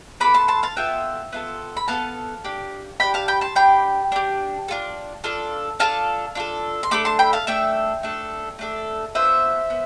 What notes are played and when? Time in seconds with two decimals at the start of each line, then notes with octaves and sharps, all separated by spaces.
0.20 B3 F4 A4 B5 D6
0.34 A5 C6
0.48 A5 C6
0.63 F5 A5
0.76 B3 F4 A4 E5 G5
1.33 B3 F4 A4
1.77 B5
1.88 B3 F4 A4 F5 A5
2.45 D4 G4
3.00 D4 G4 G5 B5
3.14 F5 A5
3.28 G5 B5
3.41 A5 C6
3.55 D4 G4 G5 B5
4.12 D4 G4
4.68 D4 F4 A4
5.24 D4 F4 A4
5.80 D4 F4 A4 F5 A5
6.35 D4 F4 A4
6.83 C6
6.91 A3 D4 A4 B5 D6
7.05 A5 C6
7.19 G5 B5
7.33 F5 A5
7.47 A3 D4 A4 E5 G5
8.03 A3 D4 A4
8.59 A3 D4 A4
9.15 B3 D4 F4 C5 E5
9.70 B3